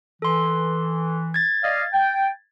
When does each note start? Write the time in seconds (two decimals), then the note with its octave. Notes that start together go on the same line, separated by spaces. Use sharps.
0.22 E3 A4 C6
1.34 G#6 A6
1.63 D5 D#5 F5
1.93 G5